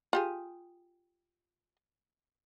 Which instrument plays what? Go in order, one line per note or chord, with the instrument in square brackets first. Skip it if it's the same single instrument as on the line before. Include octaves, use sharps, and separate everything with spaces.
[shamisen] F4 G4 G#4